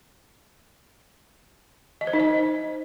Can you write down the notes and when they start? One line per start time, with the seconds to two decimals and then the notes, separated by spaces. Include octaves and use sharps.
2.01 D#5
2.07 C5
2.13 D#4
2.20 D#5